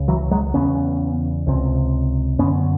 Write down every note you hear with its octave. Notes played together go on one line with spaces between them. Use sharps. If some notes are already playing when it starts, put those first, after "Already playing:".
Already playing: C#2 C#3
E3 F#3
F#3 G#3
E2 C#3 B3 C#4
C#2 C3
F#2 D3 B3 C#4